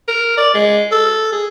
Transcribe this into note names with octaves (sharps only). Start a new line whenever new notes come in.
A#4
D5
G#3
A4
G#4